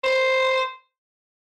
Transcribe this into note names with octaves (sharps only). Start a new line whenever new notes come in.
C5